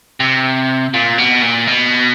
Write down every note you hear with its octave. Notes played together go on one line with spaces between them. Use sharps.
C3
A#2
B2
A#2
B2